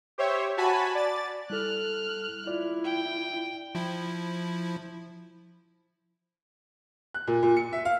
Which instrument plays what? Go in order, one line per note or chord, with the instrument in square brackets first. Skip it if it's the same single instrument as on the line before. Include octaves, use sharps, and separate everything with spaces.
[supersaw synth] G4 C5 C#5 E5
F#4 G#5 A5 B5
D5 A6
[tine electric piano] G3 E4 A4 [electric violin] F6 F#6
[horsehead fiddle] E4 [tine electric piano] F4 D5
[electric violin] G5
[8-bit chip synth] F3 E4
[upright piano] F#6
A#2
A#2
C#7
E5
F5